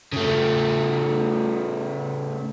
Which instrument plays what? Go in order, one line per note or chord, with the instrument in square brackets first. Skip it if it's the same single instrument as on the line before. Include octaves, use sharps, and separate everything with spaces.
[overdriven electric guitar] C#3 A3